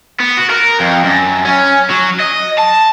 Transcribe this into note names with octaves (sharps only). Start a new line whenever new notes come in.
B3
F#4
A#4
F2
F#2
C#4
F#3
D#5
A5